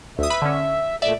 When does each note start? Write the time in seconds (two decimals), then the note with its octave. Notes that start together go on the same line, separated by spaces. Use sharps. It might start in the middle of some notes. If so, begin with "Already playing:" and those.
0.19 D2 E5 D#6
0.30 B4 B5
0.42 D3 C#4
1.02 A#2 A3 D5 E5